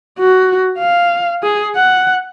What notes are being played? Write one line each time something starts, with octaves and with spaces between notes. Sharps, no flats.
F#4
F5
G#4
F#5